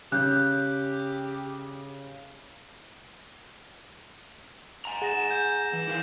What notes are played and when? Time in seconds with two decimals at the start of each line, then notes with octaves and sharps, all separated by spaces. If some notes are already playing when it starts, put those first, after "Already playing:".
0.12 C#3 G4 F#6 G6
4.85 G#5 A#5
5.02 G#4 F#5 A6 A#6 E7
5.30 G6
5.73 E3
5.88 E4 A#4 F5